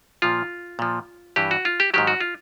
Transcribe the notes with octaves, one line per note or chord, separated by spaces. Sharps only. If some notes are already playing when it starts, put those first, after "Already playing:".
A#2 F3 F4
A#2 F3
G2 E3 G4
F#4
F4
G4
G#2 D#3 F#3 G4
F#4
F4